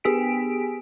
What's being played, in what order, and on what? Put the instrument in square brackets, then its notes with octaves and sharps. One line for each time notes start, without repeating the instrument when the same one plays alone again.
[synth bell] B3 G4 G#4 G#5 B6 D7